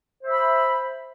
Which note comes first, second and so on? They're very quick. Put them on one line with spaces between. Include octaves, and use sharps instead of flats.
C5 E5 B5